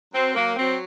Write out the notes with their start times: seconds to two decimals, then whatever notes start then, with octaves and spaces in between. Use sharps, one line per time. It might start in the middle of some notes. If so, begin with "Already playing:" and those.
0.12 F#3 C4
0.35 F#3 A#3
0.56 F#3 C4